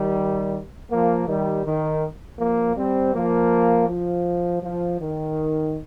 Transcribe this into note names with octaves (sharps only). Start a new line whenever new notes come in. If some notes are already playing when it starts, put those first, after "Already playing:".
Already playing: D#3 G3
F3 A#3
D#3 G3
D#3
F3 A#3
G3 C4
F3 A#3
F3
F3
D#3